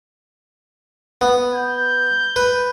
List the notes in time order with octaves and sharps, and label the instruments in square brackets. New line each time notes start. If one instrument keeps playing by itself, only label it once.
[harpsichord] B3
[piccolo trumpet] G6
[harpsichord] B4